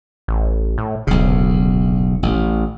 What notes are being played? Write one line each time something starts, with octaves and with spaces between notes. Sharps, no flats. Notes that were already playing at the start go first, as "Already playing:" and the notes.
A1
A2
D1 B1 C#3
A1